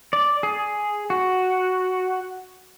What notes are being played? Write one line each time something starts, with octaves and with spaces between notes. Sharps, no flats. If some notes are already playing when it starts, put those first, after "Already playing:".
D5
G#4
F#4